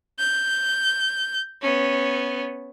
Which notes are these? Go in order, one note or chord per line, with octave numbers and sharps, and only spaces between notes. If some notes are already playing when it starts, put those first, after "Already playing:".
G6
B3 C#4